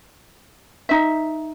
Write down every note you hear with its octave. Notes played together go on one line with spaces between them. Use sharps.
D#4 E5